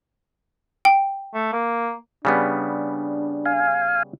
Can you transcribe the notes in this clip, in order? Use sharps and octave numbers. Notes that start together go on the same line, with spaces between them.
G5
A3
A#3
C#3 G3 B3 D4
F5 G#5